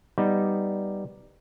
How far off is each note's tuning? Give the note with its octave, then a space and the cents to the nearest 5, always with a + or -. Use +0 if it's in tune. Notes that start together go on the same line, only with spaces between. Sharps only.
G3 +0 B3 +0 D#4 +0